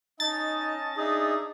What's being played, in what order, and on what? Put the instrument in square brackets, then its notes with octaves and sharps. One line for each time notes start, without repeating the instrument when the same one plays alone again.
[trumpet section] C#4 D#5 A5 [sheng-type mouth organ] D#4 [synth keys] A6
[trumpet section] D4 E5 D#6 [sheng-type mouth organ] D#4 G#4